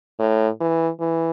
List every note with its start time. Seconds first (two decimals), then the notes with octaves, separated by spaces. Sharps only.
0.20 A2
0.61 E3
1.01 E3